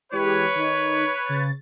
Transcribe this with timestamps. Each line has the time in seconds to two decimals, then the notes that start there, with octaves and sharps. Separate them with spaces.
0.12 E3 G#3 G4 B4 C#5
0.55 D#3 D#4
1.26 C#3 A6